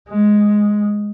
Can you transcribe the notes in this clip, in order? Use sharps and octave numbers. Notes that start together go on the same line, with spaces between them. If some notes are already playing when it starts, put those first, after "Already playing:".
G#3